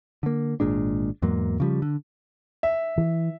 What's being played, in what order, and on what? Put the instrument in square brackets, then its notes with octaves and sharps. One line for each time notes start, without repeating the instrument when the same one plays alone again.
[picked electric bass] D3 A#3
G#1 A#2 G#3 D4
E2 G#2 F#3 A#3
C#3 F3 G3
D3
[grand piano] E5
[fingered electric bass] E3